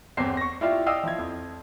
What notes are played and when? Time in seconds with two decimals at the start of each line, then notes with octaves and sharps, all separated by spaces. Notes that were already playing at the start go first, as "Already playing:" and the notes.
0.17 G1 E2 C4 C7
0.37 C#6 A#6
0.61 E4 F4 G4 D5 E5 F5
0.86 D5 D#5 F5 G5 D#6 E6
1.03 F3 E4 G#6
1.18 F2